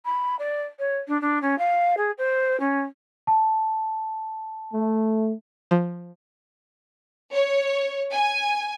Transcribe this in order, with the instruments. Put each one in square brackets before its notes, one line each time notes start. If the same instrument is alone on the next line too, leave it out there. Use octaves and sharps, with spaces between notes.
[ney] B5
D5
C#5
D4
D4
C#4
F5
G#4
C5
C#4
[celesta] A5
[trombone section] A3
[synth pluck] F3
[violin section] C#5
G#5